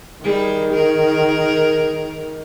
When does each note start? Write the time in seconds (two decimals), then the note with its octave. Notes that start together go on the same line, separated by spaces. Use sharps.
0.24 D#3 G3 G#4
0.74 G#4 A#4